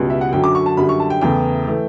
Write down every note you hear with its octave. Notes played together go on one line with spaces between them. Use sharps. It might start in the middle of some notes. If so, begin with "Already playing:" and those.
Already playing: C#2 B2 G3
E5
F#5
F#2 D3 F#3 G5
D6
C#6
A5
F#2 D3 G3 B5
C#6
A5
G5
E2 C#3 E3 A3 G5
E3 A3